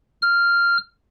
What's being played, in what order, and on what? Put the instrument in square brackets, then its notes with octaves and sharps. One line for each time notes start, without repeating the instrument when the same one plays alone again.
[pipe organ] F6